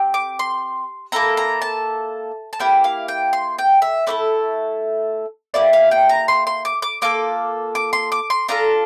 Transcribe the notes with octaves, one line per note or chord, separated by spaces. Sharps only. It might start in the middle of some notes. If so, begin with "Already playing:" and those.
Already playing: C4 G4
D6
C6
A#3 E4 A4 A#5
A#5
A5
A5
A#3 E4 G4 G5
F5
G5
C6
G5
E5
A3 E4 A4 D5
A#3 E4 G4 D5
F5
G5
A#5
C6
C6
D6
D6
A#3 F4 A4 D6
D6
C6
D6
C6
D4 F4 A4 A#5